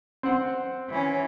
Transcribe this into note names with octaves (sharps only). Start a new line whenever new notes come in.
C4 F#5 C6
E3 C#4